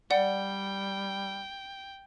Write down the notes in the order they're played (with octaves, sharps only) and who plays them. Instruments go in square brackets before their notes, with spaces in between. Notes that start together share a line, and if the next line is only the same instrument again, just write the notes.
[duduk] G3 [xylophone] D5 F#5 [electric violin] G5